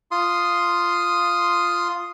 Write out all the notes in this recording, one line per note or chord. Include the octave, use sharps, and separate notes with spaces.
F4 C6 D#6